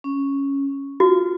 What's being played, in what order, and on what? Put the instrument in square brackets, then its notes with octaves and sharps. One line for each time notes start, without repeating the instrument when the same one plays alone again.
[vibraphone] C#4
[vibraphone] F4 [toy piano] F#4